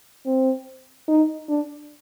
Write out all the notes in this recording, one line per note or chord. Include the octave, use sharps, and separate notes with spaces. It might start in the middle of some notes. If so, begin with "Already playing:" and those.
C4
D#4
D4